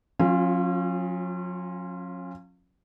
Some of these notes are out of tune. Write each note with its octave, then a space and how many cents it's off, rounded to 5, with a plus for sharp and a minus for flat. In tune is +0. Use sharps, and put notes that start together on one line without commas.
F#3 -45 C#4 -30 F4 +0